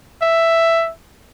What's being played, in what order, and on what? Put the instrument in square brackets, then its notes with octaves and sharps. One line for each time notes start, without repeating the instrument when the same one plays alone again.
[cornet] E5